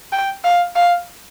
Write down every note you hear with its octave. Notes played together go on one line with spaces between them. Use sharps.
G5
F5
F5